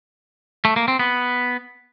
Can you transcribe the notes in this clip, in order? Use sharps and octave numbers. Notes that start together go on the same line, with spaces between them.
A3
A#3
C4
B3